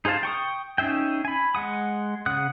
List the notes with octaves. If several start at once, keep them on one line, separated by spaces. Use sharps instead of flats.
D#4 G#4 C5 F5 A5
G5 C#6 D#6
C#4 D#4 G#4 E5 G5
G#5 B5
G#3 F#5 D#6
C#3 F#5 D#6 F#6